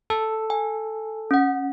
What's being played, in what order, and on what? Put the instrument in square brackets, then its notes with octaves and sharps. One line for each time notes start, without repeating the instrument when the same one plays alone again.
[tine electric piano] A4
[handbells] G#5
C#4 F#5